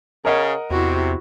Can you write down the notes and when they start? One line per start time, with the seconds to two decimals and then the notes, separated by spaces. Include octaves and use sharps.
0.25 C#3 A#4 D#5 F#5
0.70 E2 C3 E4 F#4